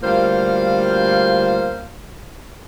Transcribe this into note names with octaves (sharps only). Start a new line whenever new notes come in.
D2 G3 A#3 F4 C5 F5